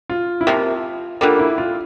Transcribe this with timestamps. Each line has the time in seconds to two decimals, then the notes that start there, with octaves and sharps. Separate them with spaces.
0.10 F4
0.41 E4
0.47 C3 F3 A#3 F4
1.21 D3 G3 A#3 F4
1.39 E4
1.58 F4